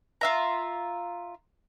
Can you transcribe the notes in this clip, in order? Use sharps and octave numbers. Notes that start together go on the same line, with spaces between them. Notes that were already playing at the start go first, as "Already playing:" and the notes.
F4 E5 A#5